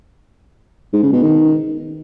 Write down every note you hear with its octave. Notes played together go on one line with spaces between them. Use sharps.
G#2
C#3
B2
D#3